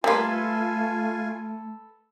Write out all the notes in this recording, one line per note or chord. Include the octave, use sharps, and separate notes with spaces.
G3 A3 A#3 F4 A4 B4 G#5 C6